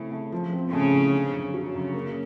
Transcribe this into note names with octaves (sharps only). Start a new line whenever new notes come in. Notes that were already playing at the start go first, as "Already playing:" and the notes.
Already playing: C#3 A3 C4 E4
A3
F3
C4
C#3 A3
A2
D3
F#2
C#3 F#3
F#2
A#3